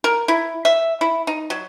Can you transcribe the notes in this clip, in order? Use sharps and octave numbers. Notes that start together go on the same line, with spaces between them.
A#4
E4
E5
E4
D#4
F#3